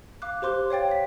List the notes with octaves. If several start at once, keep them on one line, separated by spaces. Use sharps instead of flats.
F5 D6 F#6
G4 C5 C6 D6 F#6
C#5 F5 G5 A6
B6